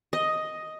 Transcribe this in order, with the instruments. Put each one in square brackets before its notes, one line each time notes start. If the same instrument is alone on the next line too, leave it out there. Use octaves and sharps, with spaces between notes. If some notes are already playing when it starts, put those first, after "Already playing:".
[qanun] D#5